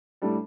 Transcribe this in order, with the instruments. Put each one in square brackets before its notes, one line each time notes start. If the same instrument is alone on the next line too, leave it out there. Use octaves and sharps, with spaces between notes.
[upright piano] A2 G3 D4 A4